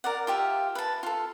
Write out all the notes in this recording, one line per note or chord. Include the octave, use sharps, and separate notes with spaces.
A#4 D5 F#5
F4 G4 E5 F5
B4 A5
F4 A4